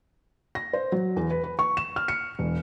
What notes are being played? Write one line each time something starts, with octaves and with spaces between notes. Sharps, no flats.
A#6
C5
F#3
E2
B4
B4
C#6
E7
F6
C#7
E1